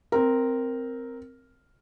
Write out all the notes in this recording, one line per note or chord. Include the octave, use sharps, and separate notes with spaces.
C4 A#4